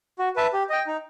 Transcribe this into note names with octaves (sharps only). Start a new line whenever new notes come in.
F#4
B4 E5 A5
G4
D#5 G5
D#4